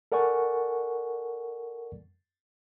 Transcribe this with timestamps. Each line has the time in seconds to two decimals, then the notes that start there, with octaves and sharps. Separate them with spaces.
0.12 A4 A#4 D5 F#5 G#5 C#6